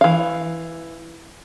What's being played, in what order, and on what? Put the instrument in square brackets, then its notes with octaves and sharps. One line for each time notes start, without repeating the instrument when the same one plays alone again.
[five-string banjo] E3 F5